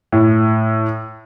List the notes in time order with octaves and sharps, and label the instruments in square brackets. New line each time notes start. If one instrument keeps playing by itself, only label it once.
[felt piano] A2